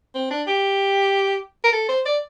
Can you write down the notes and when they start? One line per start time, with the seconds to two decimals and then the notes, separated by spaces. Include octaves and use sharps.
0.15 C4
0.31 D4
0.47 G4
1.64 A#4
1.73 A4
1.89 C5
2.06 D5